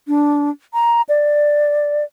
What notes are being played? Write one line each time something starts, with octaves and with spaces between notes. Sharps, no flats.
D4
A#5
D5